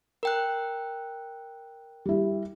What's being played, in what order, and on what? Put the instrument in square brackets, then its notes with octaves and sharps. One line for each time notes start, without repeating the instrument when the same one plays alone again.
[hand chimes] A#4 G5 F#6
[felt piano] G3 E4